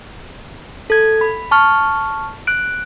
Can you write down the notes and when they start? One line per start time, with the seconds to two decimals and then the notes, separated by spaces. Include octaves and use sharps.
0.90 A4 G#6
1.21 B5
1.51 A5 C#6 F6
2.47 F#6 D7